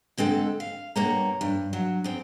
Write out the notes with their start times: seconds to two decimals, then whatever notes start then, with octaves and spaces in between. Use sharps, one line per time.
0.18 D3 G#3 C4 A4
0.60 F5
0.96 G2 B2 A#3 C#5 A#5
1.41 G2
1.73 F#3
2.04 E2 C4